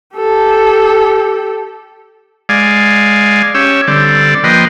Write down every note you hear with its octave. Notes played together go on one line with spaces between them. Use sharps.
G4 A4
G#3 D5 F5 G#5
C#4 G4 C#5 E6
D3 G3 C4 A4 D5
F3 A#3 B4 D#5 G5 C6